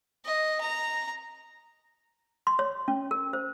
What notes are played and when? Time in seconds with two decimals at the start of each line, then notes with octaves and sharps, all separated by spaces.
0.25 D#5
0.61 A#5
2.47 C6
2.59 C#5
2.88 C#4
3.11 A#4
3.33 C5